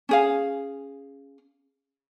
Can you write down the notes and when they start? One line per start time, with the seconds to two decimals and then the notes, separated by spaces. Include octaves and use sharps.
0.09 C#4 G#4 F5